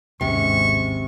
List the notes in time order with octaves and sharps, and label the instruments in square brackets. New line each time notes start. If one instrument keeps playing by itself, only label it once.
[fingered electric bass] G#1 D#2 C#4 [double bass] G#2 [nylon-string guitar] C3 [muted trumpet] C#6